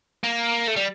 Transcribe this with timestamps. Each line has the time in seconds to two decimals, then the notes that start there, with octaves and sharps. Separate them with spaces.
0.23 A#3
0.68 A3
0.76 G3